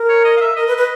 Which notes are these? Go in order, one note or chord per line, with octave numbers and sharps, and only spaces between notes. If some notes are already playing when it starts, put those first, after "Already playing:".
Already playing: A#4
C#5
D#5
F5
E5
A#4 D#5
B4
B4